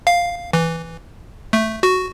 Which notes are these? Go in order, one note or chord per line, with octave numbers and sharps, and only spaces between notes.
F5
E3
A3
F#4